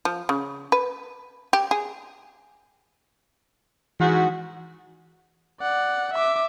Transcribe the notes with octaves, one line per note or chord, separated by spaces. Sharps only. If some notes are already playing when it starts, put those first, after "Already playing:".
F3
C#3
B4
G4
G#4
G#2 E3 F#4
D5 F#5
E5 D6